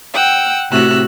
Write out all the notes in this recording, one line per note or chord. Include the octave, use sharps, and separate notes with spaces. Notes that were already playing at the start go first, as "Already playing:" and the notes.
F#5 G5 E6
A2 C3 F#4 E6 F#6